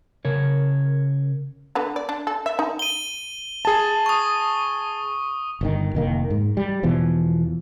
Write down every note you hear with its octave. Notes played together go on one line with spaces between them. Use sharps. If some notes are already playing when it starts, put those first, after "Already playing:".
C#3 A#4 C#5
D3 B3
D5
D4
A4
E5
D#4
D#7 G7
G#4 A5
C#6 D#6
G1 A#2 D#3
F1 D#3 A#3
G#2
G3
E2 B2 E3 F3